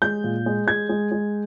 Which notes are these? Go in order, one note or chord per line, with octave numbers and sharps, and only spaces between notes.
G#3 G6
A#2
G#3
G#3 G#6
G#3
G#3